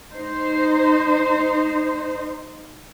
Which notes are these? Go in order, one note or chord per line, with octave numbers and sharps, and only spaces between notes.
D#4 C5